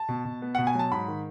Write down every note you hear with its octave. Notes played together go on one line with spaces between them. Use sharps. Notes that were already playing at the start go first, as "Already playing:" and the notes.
Already playing: A5
B2
B2
B3
B2 F#5
G#5
F#3 A5
G#2 B5
D#3